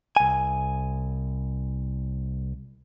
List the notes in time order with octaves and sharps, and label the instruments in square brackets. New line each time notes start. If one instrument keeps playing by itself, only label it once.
[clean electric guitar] C2 G#5